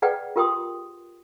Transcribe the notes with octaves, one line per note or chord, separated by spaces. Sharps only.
G#4 B4 D5 F#5 G5
F4 G4 A#4 G5 C6 D#6